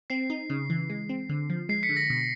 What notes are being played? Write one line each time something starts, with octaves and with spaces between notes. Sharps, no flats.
C4 C7
D#4
C#3
E3
G#3
C4
D3
F3
G#3 C7
B6 C#7
D3
A#6
B2